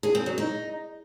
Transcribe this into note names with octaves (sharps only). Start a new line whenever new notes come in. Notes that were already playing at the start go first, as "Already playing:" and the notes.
G#4
C4
F#3
D#4